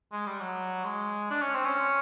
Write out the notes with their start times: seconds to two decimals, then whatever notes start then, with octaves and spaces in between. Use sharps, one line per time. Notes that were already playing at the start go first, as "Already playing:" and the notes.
0.12 G#3
0.26 G3
0.40 F#3
0.84 G#3
1.30 D4
1.42 C#4
1.55 C4
1.66 C#4